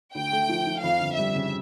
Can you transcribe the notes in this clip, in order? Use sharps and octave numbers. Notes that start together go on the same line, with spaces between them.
D2 G5
A3
F3
F3
F2 F5
G1
G3 E5
C#3